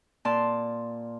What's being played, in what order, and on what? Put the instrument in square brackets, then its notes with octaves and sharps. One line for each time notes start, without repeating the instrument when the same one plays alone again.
[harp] A#2 D5 A5 C6